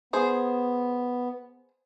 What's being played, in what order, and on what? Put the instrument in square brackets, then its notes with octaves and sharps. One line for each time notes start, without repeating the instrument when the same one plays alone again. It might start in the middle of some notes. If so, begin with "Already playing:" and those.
[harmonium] B3 [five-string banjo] G#4 C5